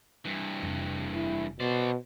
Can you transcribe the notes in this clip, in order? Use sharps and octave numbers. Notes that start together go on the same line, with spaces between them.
G2 E3
F1
E4
B2 C5 D5